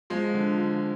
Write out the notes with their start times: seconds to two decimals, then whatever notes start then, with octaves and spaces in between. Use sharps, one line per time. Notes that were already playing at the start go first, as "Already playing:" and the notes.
0.10 F3 G#3
0.34 D3
0.57 F3